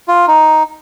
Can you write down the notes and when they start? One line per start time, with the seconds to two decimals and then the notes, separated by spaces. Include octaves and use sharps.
0.08 F4
0.28 D#4